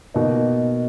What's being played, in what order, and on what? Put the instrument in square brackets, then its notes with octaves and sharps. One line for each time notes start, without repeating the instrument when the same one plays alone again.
[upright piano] B2 A#3 D#4